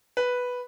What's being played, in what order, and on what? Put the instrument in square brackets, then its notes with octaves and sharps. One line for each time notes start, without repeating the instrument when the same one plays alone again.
[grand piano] B4